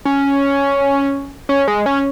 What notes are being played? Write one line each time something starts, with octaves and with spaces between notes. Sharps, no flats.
C#4
C#4
G#3
C#4